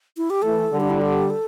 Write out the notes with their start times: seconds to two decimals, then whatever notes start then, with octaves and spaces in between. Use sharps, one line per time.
0.17 E4
0.30 G4
0.42 E3 A3 A4
0.72 D3 G3
0.80 D4
0.90 E4
1.01 G4
1.30 A4